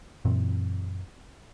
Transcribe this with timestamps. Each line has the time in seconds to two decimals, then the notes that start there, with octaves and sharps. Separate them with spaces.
0.25 F#2 A#2 E3 C4